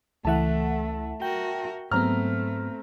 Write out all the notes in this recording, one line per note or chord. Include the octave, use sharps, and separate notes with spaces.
C#2 E3 A3 E5 F#5 A5
F#4 A#4 G5
G#2 F#3 A3 B3 C4 A#5 F6